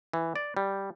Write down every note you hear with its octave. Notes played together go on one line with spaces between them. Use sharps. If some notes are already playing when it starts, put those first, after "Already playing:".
E3
D5
G3